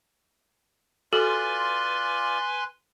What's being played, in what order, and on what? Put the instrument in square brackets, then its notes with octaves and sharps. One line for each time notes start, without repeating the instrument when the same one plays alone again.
[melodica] F4 D5 [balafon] F#4 A4 [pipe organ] B4 G#5 C6